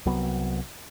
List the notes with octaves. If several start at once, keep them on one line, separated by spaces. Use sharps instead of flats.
C2 F#3 B3